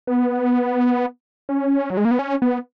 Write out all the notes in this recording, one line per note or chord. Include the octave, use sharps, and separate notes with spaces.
B3
C#4
F#3
G#3
A#3
B3
C#4
B3